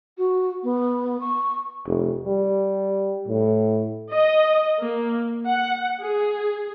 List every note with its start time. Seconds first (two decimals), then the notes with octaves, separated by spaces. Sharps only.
0.17 F#4
0.63 B3
1.20 C#6
1.86 F1
2.26 G3
3.28 A2
4.12 D#5
4.82 A#3
5.46 F#5
6.01 G#4